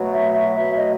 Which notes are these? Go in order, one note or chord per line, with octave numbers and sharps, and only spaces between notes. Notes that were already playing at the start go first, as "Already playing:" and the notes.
Already playing: B2 F#3 A3
E5
E5
B2 F#3 A3 E5
D#5